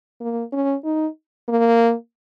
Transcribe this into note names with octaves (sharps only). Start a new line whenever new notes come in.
A#3
C#4
D#4
A#3